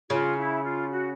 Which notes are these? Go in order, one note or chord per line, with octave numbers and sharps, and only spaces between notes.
C#3 F4
E4
F4
F#4